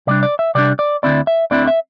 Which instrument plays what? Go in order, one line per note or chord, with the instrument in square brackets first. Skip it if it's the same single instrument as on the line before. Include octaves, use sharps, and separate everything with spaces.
[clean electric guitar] C3 G3 D4 D5
D5
E5
C3 G3 D4 D5
D5
D2 D3 C4 E4 D5
E5
D2 D3 C4 E4 D5
E5